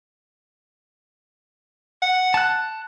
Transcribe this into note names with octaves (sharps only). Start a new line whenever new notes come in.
F#5
A5 F#6